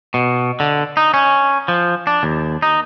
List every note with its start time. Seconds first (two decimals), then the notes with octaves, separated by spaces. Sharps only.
0.14 B2
0.60 D3
0.97 D#4
1.14 C#4
1.68 F3
2.07 D4
2.23 D#2
2.62 D#4